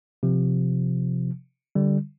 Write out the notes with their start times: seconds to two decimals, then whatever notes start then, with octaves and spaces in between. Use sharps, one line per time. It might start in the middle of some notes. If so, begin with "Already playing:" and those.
0.23 C3 F3
1.75 D3 G3